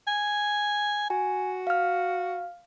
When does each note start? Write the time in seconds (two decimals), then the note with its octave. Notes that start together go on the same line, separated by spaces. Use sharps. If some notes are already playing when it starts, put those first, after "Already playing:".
0.08 G#5
1.10 F#4 G#5
1.67 F5 F6